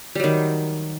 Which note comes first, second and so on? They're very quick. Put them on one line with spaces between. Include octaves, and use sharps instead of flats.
G3 F#3 D#3